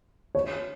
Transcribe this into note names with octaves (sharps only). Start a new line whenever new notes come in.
C#5